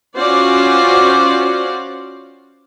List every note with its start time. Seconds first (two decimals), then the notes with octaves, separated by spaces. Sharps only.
0.17 C#4 F4 F#4 C5 D5